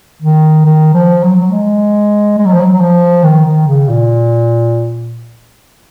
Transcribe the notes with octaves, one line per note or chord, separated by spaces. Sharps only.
D#3
D#3
F3
F#3
F#3
G#3
G#3
F#3
F3
F#3
F#3
F3
D#3
D#3
C#3
A#2